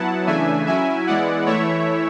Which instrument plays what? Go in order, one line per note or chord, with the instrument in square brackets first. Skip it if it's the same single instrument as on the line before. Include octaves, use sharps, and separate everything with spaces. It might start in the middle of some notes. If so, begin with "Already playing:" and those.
Already playing: [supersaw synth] F#3 B3 E4 F#5 A5
C#3 E3 A3 D4 E5 G#5
F#3 C#4 E4 E5 G#5
E3 G#3 B3 E4 D5 F#5
E3 A3 E4 C#5 E5